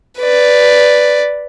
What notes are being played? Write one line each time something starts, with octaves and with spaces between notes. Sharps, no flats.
B4 D5